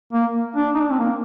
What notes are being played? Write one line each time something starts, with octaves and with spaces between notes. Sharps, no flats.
A#3
D4
D#4
D4
C4
A#3